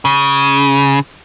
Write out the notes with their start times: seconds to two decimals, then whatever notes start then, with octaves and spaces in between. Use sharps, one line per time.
0.05 C#3